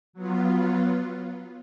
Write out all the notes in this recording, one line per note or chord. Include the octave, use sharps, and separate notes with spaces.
F#3 B3 F4